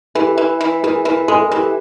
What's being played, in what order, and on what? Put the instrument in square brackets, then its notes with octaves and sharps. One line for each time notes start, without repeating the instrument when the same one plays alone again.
[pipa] E3 [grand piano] G4 A4
[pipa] E3
E3
[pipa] E3 [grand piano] G#4 A#4
[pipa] E3 [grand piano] G#4 A#4
[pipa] G#3 [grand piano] A4 B4
[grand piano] A#4
[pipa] E3 [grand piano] G4 A4